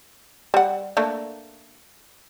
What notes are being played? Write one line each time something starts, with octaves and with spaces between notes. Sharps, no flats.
G3 F#5
A3 A#3 D4